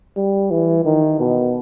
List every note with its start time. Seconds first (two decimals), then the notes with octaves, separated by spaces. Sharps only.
0.17 G3
0.51 E3
0.85 D#3
1.19 B2